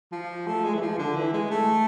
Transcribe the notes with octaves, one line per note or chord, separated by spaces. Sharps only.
F3
A3
G#3
E3
F3
D3
E3
G#3
A3